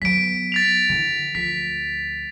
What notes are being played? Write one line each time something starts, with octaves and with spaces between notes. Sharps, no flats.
F#3 B3 B6 D7
A6 B6 F7
D3 E3
D2 F3 B6